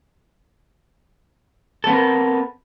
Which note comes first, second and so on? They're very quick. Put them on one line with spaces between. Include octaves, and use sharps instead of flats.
A4 B3 C4 A#4